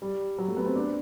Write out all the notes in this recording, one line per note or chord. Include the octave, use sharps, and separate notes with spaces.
G3
F#3
A3
B3
C4
D4